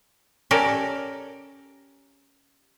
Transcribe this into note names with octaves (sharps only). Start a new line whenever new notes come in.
C#4 G4 A4 A#4 D5